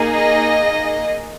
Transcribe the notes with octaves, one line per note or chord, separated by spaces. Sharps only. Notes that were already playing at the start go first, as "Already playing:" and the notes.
Already playing: A#3 D#4 G#4
D#5